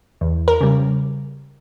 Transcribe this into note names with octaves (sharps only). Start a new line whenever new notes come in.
E2
A#4
C#3 G3